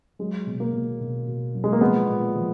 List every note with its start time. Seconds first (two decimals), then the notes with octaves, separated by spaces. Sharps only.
0.19 F#3 G#3
0.47 B2
0.60 A#3
0.73 B2
1.00 B2
1.27 B2
1.55 F#3
1.64 G#3
1.73 A#3
1.81 F3 G#3 B3
2.08 A#2
2.35 F3